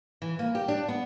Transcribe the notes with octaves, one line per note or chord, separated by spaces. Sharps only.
E3
A#3
G4
D4
B3